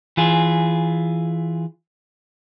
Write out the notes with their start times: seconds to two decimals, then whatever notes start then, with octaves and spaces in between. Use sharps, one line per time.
0.17 E3 F4 G#4